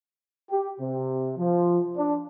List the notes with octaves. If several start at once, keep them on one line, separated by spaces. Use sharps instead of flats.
G4
C3
F3
D4